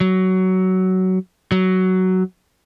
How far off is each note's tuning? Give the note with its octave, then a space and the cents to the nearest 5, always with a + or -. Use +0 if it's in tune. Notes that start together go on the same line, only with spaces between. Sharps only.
F#3 +15
F#3 +10